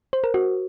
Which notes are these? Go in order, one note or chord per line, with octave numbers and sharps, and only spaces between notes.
C5
A#4
F#4